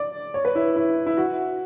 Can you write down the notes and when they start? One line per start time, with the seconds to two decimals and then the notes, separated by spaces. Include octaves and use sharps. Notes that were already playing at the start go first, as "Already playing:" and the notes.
Already playing: D5
0.34 C#5
0.45 B4
0.55 E4
0.76 E4
1.06 E4
1.17 F#4